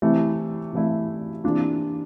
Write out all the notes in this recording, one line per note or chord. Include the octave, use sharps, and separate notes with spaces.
C3 E3 A3 E4
C3 E3 A3 E4
C3 E3 A#3 D4 F4